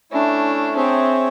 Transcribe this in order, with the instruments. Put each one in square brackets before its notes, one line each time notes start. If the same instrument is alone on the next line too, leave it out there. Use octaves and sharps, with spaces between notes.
[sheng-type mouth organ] A3 C#4 E4 [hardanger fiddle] D4
[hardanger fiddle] C4 [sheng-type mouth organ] G#4 C#5 E5 G5